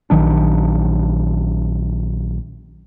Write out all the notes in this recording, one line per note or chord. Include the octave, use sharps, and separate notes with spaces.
A#1 D#3 F#3 D4